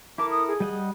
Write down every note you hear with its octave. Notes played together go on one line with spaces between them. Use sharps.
E4 A4 A#4 D6
D#6
G#4
G3 D#5 F#5